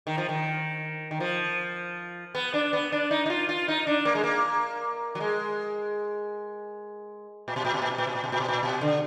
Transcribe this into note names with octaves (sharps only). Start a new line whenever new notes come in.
D#3
F3
D#3
D#3
F3
B3
D4
B3
D4
D#4
D#4
F4
F4
D#4
D4
A#3
G#3
A#3
F#3
G#3
A#2
B2
A#2
B2
A#2
B2
A#2
B2
A#2
B2
A#2
B2
A#2
B2
D3